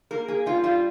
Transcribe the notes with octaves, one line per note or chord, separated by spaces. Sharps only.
A#3 A#4
A#3 G#4
G3 F4
G3 F4